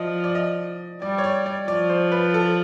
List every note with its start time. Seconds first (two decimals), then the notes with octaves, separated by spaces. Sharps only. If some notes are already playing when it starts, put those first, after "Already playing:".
Already playing: F3 D5 D#5
0.24 D5
0.35 D#5
1.02 G3 D5
1.18 C#5
1.24 D5
1.46 D5
1.68 F3 D5
1.90 C5
2.12 B4
2.34 A4